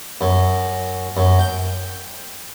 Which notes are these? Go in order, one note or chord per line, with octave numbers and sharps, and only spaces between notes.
F#2
F#2
G5